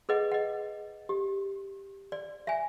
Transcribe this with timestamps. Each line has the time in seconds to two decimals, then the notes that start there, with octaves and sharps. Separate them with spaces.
0.09 G#4 B4 D#5 F#5
0.32 D#5 F#5
1.09 G4
2.12 D5
2.47 E5 G#5